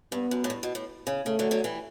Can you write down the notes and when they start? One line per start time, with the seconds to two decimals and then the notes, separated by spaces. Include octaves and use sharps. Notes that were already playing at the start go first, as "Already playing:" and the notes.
0.12 G2 B3
0.31 F#2
0.44 A2
0.50 G2
0.63 B2
0.75 A2
1.07 C#3
1.26 C#3 A3
1.39 D3 F#3
1.51 D3 F#3
1.64 E3 G3